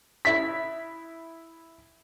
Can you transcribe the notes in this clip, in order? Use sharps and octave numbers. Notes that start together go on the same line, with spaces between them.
E4 B6